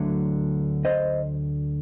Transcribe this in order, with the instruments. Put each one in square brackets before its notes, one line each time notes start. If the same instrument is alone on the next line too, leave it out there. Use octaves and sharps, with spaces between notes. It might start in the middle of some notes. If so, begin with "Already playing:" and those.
Already playing: [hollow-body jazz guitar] D2 D3 F#3 A3
C5 D#5